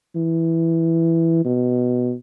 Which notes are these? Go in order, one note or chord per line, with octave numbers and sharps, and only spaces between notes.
E3
B2